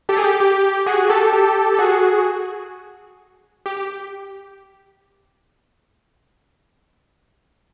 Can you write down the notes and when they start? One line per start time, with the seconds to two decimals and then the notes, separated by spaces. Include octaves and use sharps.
0.09 G4 A4
0.17 G#4
0.24 G4
0.40 G4
0.86 F#4 G#4
1.10 G4 A4
1.32 G4 A4
1.74 A4
1.79 F#4 G#4
3.66 G4
3.77 G4